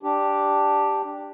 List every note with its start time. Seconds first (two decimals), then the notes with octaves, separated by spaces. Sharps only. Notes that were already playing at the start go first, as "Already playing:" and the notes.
0.03 D4 G4